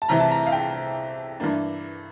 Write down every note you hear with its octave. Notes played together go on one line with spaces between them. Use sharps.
A5
C2 C3 E3 A#5
A5
A#5
F5
G5
G2 E3 A#3 D4